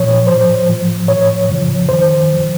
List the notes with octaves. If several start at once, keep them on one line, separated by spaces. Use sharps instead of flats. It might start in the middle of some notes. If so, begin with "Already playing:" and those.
Already playing: A#2 F3 C#5
A2 F3 C5
A2 F3
A2 F3 C#5
F#2 C#3 F3
F#2 D#3 C5
F#2 F3